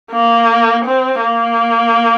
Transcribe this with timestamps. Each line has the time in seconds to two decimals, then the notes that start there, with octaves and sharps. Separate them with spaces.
0.11 A#3
0.85 C4
1.21 A#3